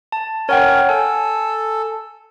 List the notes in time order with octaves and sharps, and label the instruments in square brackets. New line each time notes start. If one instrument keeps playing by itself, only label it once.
[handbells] A5
[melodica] C#4 A#4 [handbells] C#5 F#5 G5
[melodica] A4 [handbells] G#5